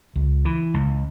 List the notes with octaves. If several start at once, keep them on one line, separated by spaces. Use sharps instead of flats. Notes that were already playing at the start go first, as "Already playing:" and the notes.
C#2
E3
C#2